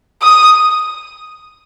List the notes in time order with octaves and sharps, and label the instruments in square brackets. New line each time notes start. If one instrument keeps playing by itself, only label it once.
[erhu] D#6